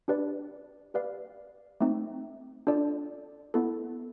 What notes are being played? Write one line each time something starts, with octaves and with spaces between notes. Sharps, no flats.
D4 G4 B4 D5
G4 B4 D5 F5
A3 C4 D#4
D4 F4 A4 D5
B3 E4 A4